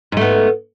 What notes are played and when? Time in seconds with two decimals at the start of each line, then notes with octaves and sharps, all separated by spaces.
0.12 G#2
0.17 A3
0.21 B3